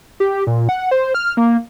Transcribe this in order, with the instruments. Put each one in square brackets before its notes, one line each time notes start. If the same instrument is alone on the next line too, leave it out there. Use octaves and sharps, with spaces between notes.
[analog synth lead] G4
A#2
F#5
C5
F6
A#3